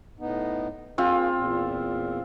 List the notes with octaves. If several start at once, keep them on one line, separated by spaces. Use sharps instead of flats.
A2 B3 D#4
A#3 C4 F4 G#4
E2 A#2